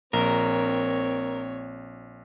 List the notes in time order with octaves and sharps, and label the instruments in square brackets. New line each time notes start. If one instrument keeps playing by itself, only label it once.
[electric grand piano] A#1 [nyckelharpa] C4 C#5 [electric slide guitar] A#4